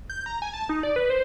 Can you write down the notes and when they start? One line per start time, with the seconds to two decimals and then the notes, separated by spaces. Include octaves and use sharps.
0.10 G6
0.26 A#5
0.42 G#5
0.53 A5
0.69 D#4
0.83 D5
0.96 B4
1.10 C5